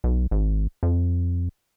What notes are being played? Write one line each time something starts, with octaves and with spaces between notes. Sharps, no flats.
B1
G#1
F2